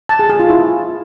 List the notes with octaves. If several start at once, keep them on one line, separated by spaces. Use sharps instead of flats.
A5
G#4
G#4
F4
E4